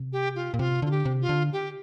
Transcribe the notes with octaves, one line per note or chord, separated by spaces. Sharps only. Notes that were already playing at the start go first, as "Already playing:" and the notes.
Already playing: C3
G4
F4
A#2
C3 F4
D3 F4
G4
C3
F4
D3
G4